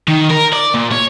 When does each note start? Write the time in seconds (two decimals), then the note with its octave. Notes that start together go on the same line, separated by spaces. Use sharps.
0.08 D#3
0.31 A#4
0.53 D5
0.74 A#2
0.92 C#5